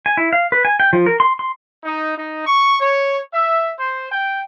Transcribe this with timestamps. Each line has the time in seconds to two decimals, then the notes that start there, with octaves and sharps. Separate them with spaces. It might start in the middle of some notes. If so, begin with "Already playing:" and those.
0.06 G#5
0.17 E4
0.33 F5
0.52 B4
0.65 G#5
0.80 G5
0.93 F3
1.06 A#4
1.20 C6
1.39 C6
1.82 D#4
2.15 D#4
2.45 C#6
2.79 C#5
3.31 E5
3.78 C5
4.10 G5